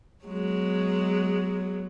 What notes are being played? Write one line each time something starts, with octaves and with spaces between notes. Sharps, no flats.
F#3 G#3 B3